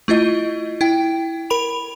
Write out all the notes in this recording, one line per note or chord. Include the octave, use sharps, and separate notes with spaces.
A3 E4 F4 D#5
E4 G5
A#4 B5 F7